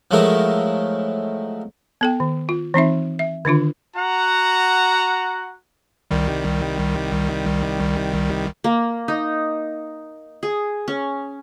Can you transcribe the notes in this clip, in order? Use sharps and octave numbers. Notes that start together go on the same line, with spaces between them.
F3 F#3 G#3 A3 E4 A#4
B3 A4 G5
D#3
F4
E3 C4 D#4 E5
E5
D3 D#3 D4 F4
F#4 F#5 A#5
C2 D#3 G3
A#3
D#4
G#4
C#4